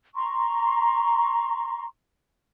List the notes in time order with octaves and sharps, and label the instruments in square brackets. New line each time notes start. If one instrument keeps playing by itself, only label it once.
[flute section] A#5 C6 C#6